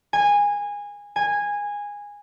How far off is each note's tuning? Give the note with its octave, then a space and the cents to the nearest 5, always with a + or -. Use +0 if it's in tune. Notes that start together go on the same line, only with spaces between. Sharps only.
G#5 -20
G#5 -15